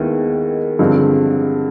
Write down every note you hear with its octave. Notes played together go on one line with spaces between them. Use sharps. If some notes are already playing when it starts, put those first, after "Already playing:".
Already playing: D#2 D#3 G#3 B3 E4
G2 D3 F3 G#3 C4